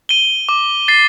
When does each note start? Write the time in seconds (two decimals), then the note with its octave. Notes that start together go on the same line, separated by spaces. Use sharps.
0.09 D#7 G7
0.49 D6
0.88 A6 C7